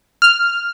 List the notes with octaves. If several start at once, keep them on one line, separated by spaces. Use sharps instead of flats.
F6